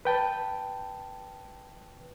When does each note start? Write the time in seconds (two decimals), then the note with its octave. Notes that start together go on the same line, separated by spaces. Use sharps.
0.05 B4 G5 A5